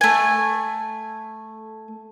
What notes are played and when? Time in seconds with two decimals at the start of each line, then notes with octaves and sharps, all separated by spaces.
0.01 A3 G#5